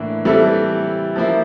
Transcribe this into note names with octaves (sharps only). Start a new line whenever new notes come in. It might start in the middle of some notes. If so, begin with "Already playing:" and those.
Already playing: A2 E3 A#3 D4
E3 G3 C4 E4 A4
F3 A#3 E4